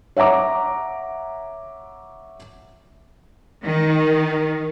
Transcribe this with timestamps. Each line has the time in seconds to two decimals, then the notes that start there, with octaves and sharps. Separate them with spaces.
0.17 C#5 E5 F#5 A#5 D6
3.64 D#3